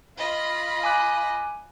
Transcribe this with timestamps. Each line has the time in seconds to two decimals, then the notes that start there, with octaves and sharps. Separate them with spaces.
0.18 F4 D#5 B5
0.83 G#5 D6 F#6